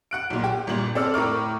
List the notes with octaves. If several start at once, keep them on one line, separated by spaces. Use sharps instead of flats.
F#5 F#6 D7
B1 A#2
G4
G1 A#2 F#7
C4 A4 D5 E6 F6
A2 A#4 D6 F6